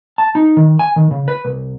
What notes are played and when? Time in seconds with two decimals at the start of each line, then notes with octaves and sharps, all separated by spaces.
0.18 A5
0.35 D#4
0.57 D#3
0.79 G#5
0.96 D#3
1.11 C#3
1.28 B4
1.45 C2